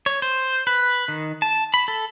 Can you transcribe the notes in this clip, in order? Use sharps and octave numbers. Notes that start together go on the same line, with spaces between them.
C#5
C5
B4
D#3
A5
B5
A4